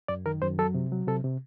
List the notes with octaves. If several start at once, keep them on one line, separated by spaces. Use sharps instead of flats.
F#2 D5
D#3 A#4
F#2 C5
F#3 A4
C3
F#3
C3 A4
C3